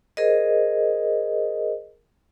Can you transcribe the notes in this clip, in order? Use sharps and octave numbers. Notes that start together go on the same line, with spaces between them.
G#4 A#4 C5 D#5